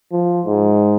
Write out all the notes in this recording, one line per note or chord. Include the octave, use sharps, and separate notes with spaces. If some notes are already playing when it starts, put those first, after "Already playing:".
F3
G#2